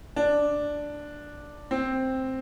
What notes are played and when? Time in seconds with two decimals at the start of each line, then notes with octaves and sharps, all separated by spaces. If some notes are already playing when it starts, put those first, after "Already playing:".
0.16 D4
1.71 C4